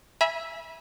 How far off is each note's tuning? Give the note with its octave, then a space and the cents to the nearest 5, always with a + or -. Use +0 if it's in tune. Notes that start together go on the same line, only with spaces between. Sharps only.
E5 +0 G#5 +0 B5 -35